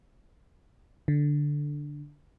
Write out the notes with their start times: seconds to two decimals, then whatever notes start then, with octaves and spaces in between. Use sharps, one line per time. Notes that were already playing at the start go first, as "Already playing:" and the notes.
1.08 D3